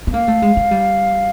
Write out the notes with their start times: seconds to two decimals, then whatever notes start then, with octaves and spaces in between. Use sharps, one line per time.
0.07 B3
0.13 A#3 F5
0.28 A3
0.42 G#3
0.57 G#3
0.71 G3